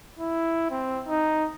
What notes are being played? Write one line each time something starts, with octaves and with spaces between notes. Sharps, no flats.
E4
C4
D#4